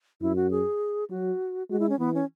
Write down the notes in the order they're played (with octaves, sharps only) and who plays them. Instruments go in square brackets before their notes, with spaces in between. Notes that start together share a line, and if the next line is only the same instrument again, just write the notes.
[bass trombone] F#2 [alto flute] E4
[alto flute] F#4
G#4
[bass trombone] F#3 [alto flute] F#4
[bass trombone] G#3 [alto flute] F#4
[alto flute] E4
C#4
[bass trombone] E3 [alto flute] B3
[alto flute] C#4